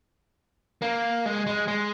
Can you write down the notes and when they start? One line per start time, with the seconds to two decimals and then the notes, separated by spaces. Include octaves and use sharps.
0.82 A#3
1.26 G#3
1.47 G#3
1.68 G#3